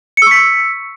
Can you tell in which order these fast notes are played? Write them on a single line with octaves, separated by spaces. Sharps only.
C#7 E6 C#6 B6